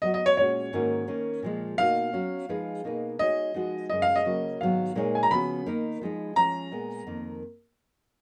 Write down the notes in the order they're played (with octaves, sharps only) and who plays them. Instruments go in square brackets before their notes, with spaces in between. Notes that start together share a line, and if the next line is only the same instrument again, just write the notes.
[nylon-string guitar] F#3 B3 F#4 [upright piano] D#5
[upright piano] D#5
C#5
[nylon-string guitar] A#2 G#3 C#4 F#4 [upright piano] C#5
[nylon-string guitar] G#2 D#3 A#3 C#4 F#4
D#3 A#3 C#4
A#2 F3 G#3
[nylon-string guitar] B2 A#3 D#4 F#4 [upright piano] F5
[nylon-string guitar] F#3 C#4 F#4
F3 G#3 D#4 G#4 B4
B2 A#3 D#4 G#4 B4
[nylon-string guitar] G#3 D#4 F#4 C#5 [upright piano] D#5
[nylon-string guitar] F3 G#3 D#4 F#4 B4
[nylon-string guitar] F#2 C#3 G#3 [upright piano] D#5
[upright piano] F5
D#5
[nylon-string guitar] C#3 F#3 A#3 C#4 F#4
[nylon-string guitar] G#2 D#3 F#3 B3 [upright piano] F5
[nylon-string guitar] A#2 G#3 D#4 A#4 C#5
[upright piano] G#5
A#5
[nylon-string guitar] C#3 F3 B3 F#4 [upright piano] B5
[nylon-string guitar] D#3 A#3 D#4 A#4
F3 G#3 D#4
[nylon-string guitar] F3 G#3 C#4 [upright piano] A#5
[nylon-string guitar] A#2 G#3 B3
F2 D#3 A#3